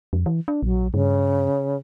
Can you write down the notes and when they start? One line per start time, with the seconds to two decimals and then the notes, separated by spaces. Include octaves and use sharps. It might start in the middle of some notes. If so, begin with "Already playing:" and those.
0.13 F2
0.26 E3
0.48 D4
0.63 A#1 F#3
0.94 G2 C#3